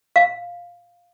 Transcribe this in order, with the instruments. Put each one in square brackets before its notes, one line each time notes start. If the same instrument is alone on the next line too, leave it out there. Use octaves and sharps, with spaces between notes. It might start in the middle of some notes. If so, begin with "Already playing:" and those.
[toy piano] F5